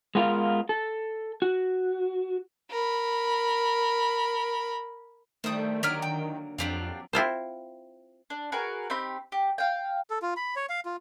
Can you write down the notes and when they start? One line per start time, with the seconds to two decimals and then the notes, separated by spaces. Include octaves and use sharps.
0.15 G#3 B3 F4 A#4 F5
0.69 A4
1.42 F#4
2.71 A#4 B5
5.44 D#3 G3 A3 C5 D#6
5.83 D3 D#3 F#3 A#3 G4 C#5 F6
6.02 G5
6.58 F2 F3 F#3 C4 D4 G4 F5
7.13 C4 E4 F4 C5
8.30 D4
8.52 F#4 G#4 A#4 B4
8.90 C4 D#4 G4 B5
9.32 G4
9.58 F5 G5
10.10 A4
10.22 F4
10.37 B5
10.56 C#5
10.69 F5
10.85 F4